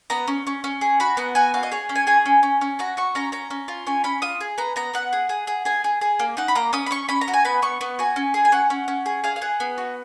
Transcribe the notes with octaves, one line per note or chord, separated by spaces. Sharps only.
B3 A#5
C#4
C#4
C#4
G#4
F#4 B5
B3 A#5
F#4 G#5
F#4 F5
D#5
G#4 C#5
C#4
G#5
G#4 G#5
C#4
C#4
C#4
F#4 A#5
F#4 C#6
C#4 A#5
C#4 A#5
C#4
F4
C#4 G#5
C#4 B5
F4 D#6
G#4
B3 A#5
B3 A#5
B3 F#5
G#4
G#4
G#4
G#4 G#5
G#4
G#4
A#3
D#4 F#5
B5
A#3 A#5
C#4 D#6
B5
C#4 C#6
C#4 B5
A#5
F#4
G#5
B3 B5
B3 C#6
B3 C#6
F#4 G#5
C#4
G#4
G#5
C#4 F#5
C#4
C#4
G#4
G#4 F5
F5
G#4 F#5
B3
F#4